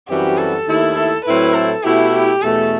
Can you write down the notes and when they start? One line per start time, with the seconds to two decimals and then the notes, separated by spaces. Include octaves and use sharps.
0.08 F#2 E3 G3 C4 F#4 G4
0.38 A4
0.67 D#2 D#3 A3 E4
0.96 A4
1.25 A2 F#3 C4 E4 B4
1.54 A4
1.84 B2 A3 E4 G4
2.13 G4
2.42 E2 B2 A3 A4